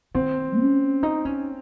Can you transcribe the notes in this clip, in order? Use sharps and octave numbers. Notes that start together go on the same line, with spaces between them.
D#3 C4
C#4
D#4
C#4